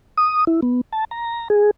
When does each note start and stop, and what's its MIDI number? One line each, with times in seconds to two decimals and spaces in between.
0.18 0.45 87
0.47 0.60 64
0.63 0.81 59
0.93 1.05 81
1.11 1.48 82
1.50 1.71 68